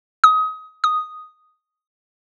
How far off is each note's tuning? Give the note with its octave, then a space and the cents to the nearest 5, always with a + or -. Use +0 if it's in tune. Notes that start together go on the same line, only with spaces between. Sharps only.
D#6 +25
D#6 +0